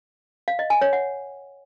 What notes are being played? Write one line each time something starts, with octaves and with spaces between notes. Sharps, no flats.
F5
D#5
G#5
C#5
F#5